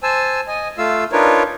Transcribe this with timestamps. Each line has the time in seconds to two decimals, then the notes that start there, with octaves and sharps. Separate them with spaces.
0.03 C5 G#5 A5 E6
0.47 D#5 G#5
0.78 A3 F4 F5 E6
1.12 D4 D#4 F4 A#4 B4 C#5